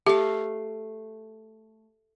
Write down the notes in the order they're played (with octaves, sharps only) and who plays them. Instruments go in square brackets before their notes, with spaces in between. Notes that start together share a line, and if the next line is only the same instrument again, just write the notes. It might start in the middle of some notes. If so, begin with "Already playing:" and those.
[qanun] A3 F5 [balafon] G4